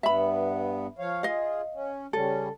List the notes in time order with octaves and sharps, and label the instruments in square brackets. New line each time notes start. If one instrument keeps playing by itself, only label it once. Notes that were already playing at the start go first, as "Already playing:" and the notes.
[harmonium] G2 B3 [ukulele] E5 B5
[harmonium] F3 C#5 F5
[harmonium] F4 G#4 [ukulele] D#5 F5
[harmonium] C#4
[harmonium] C#3 G3 C#4 [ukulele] A4